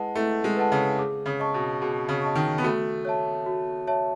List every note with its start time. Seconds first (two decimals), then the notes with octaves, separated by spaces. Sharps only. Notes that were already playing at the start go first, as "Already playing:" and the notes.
Already playing: G#3 E4 B4 D#5 F#5 A5
0.15 A3 E4
0.44 G#3
0.57 B4 D#5 F#5 A5
0.72 C#3
0.99 G#4
1.26 C#3
1.40 D#5 A5 C#6
1.54 B2
1.81 B2 G#4
2.09 C#3
2.22 D#5 A5 C#6
2.36 D#3
2.58 B3
2.63 A3 F#4
3.05 C#5 E5 A5
3.46 F#4
3.87 C#5 E5 A5